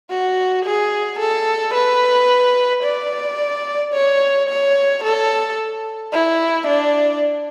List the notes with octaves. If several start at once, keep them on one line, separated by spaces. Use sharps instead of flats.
F#4
G#4
A4
B4
D5
C#5
C#5
A4
E4
D4